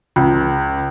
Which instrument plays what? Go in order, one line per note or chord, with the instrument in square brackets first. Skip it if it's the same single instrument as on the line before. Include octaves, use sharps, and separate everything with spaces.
[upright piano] C#2